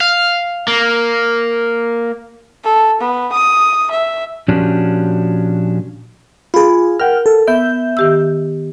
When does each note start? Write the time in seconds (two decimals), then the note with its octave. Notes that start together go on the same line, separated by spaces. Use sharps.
0.01 F5
0.68 A#3
2.64 A4
3.01 B3
3.32 D#6
3.91 E5
4.48 A#2 F3 C#4 D4 F#4 G4
6.54 F4 G#4 B5
7.00 A#4 F#5 G5 F6
7.26 A4
7.48 B3 E5 G6
7.97 D#3 G4 E6